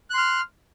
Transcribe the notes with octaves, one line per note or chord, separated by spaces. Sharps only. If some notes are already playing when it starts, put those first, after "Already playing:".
C6 F6 F#6